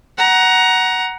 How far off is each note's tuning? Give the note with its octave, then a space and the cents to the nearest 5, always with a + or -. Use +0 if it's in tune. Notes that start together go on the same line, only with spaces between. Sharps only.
F#5 +10 A#5 +20